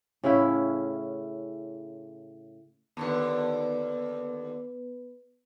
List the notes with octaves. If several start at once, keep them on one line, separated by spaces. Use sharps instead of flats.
A2 C#3 C#4 E4
D#2 B2 D3 B3 B4